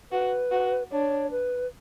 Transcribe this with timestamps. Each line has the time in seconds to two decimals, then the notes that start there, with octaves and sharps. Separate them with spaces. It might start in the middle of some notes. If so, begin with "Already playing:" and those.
0.11 F#4 B4
0.52 F#4
0.91 D4 C#5
1.31 B4